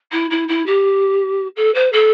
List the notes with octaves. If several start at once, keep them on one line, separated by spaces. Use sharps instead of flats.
E4
E4
E4
G4
A4
C5
A4